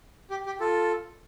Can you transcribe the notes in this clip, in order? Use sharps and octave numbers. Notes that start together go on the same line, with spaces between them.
G4
G4
F4 A4